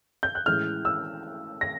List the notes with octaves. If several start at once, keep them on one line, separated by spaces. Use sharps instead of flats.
G6
F#6
A2 E3 G#3 C#4 E4 F6
E6
A#6